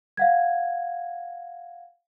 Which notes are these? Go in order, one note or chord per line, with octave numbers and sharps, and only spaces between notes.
F5 F#5 G#6